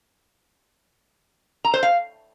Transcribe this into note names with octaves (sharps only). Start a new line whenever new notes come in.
A#5
C5
F5